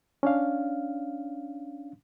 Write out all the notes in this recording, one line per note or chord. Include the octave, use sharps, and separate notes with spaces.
C#4 D4 F5